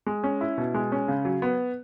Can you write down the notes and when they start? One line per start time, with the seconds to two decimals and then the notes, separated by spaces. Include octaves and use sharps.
0.06 G#3
0.24 C#4
0.41 E4
0.58 B2
0.74 G#3
0.92 C#4
1.08 C#3
1.25 F#3
1.42 B3